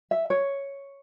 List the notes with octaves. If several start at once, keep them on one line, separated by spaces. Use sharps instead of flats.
E5
C#5